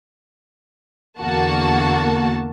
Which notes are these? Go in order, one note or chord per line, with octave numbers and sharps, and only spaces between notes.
E2 D3 A#3 F#4 A5